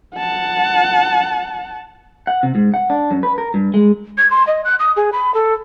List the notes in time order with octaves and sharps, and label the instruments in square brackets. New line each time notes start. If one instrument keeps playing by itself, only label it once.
[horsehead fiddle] F#5 A5
[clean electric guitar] F#5
C3
G#2
F#5
D4
F#2
B4
A#4
G2
G#3
[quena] G#6
C6
D#5
F#6
D#6
G#4
B5
A4